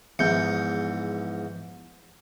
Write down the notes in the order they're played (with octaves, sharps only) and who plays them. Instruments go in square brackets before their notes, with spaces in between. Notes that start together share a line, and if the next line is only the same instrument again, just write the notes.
[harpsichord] E2 G#2 [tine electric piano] F3 G6 C#7